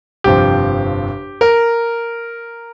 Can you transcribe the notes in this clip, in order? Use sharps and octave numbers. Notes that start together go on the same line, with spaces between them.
G1 F2 C3 F3 G4
A#4